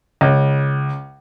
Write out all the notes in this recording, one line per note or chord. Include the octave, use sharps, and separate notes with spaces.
C#2